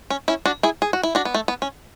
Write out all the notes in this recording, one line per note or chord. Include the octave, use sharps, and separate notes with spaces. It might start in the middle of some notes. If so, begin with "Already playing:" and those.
C#4
C#4 E4
D4 F#4
E4 G#4
G#4
F#4
E4
D4 F#4
B3
A3
B3
C#4